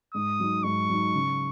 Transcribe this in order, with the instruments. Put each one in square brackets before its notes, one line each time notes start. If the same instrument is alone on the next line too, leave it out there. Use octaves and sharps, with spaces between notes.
[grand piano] G#2 [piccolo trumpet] D#6
[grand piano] F#3 D#4
[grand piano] G#2 [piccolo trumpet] C#6
[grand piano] F#3 D#4
C#3